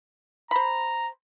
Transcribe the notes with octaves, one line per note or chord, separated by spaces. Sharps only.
C5 A#5 B5